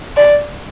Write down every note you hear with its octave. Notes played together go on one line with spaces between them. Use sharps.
D5